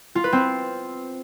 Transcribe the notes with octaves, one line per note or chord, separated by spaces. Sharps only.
F4
B4
C4